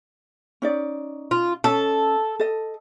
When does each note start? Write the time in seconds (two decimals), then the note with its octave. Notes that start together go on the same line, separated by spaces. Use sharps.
0.62 C#4 D#4 D5
1.31 F4
1.64 C#4 A4 D#5
2.39 A4 D#5